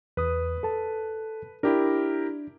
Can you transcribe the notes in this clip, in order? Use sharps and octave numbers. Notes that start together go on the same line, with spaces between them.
E2 B4 D#6
A4 A5
D4 E4 G4 A#4